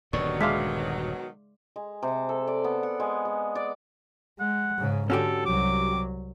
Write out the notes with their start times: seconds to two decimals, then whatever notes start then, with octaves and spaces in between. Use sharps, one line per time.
0.13 D#1 G2 B2 D3 D#3 F#3 D5 C#6
0.41 G#3 E5 F5 C6 D6 B6
1.76 G#3
2.03 C3
2.29 A4
2.47 D5
2.64 B3
2.83 F#5
3.00 G#3
3.25 G#3
3.55 D5
4.40 G#3 F#5
4.78 G#2 C#3
5.10 D3 C#4 F#4 G4 A4
5.46 C2 F#3 D6